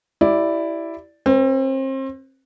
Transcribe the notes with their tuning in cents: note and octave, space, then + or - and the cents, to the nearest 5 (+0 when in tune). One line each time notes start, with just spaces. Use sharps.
E4 +0 G4 -25 D5 +0
C4 +35 B4 +0